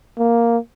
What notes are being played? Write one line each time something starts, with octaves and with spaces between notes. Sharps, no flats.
A#3